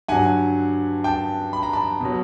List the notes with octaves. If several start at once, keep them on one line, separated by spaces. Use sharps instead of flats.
G2 D3 F#3 F#5 G#5
G5 A5
B5
A#5
A5 B5
B2 F#3